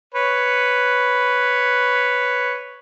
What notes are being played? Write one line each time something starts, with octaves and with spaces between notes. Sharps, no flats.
B4 C#5